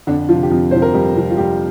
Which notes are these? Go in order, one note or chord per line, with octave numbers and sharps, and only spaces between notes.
F2 D3 D4
F3 F4
C3
G4
F2 F3 F4
C3 F3 C5
A#4
F2 G3 G4
C3 F3
F4
F2 G3 G4